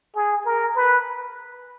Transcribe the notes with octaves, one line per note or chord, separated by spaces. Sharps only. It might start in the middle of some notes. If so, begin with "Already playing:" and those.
G#4
A#4
B4